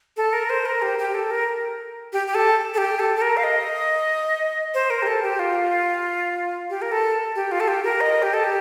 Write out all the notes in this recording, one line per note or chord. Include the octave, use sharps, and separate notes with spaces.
A4
A#4
C5
A#4
G4
G4
A4
A#4
G4
G4
A4
A4
G4
A4
A4
A#4
F5
D#5
C5
A#4
G4
A4
G4
F4
G4
A#4
A4
G4
F4
A4
G4
A#4
D#5
G4
A4
G4